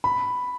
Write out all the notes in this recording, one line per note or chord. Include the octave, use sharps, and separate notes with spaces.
B5